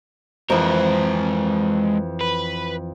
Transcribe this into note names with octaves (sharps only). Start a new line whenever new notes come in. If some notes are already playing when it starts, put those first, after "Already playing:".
F2 E3 G#3 A#4
B4